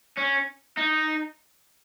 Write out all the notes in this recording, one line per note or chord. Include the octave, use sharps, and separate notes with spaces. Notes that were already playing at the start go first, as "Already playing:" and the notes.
C#4
D#4